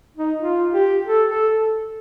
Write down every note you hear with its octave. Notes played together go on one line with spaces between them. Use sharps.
D#4
F4
G4
A4
A4